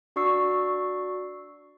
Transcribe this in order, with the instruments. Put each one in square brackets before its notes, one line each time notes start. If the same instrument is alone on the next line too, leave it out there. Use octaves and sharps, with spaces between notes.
[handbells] D4 F#4 D5 C#6 E6 C7